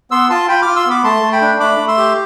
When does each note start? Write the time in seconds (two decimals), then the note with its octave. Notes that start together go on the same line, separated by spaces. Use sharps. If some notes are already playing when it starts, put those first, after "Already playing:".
0.11 B3 C6 E6
0.30 F4 A5 C6
0.48 F4 G5 B5
0.62 F4 D6 F6
0.76 C6 E6
0.86 B3 B5 D6
1.04 A3 A5 C6
1.23 A3
1.32 G5 B5
1.41 D4
1.60 A3 B5 D6
1.78 A3
1.88 C6 E6
1.98 G4